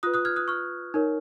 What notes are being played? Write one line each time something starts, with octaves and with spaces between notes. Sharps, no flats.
F4 B4 D#6 F#6
D#6 F#6
F6 G#6
D#6 F#6
C#6 F6
D#4 A#4 C#5